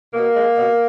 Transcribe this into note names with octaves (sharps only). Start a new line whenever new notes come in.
B2 A#3
G#3
B2